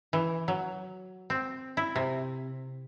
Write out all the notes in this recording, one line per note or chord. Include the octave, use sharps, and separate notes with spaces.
E3
F#3
C4
E4
C3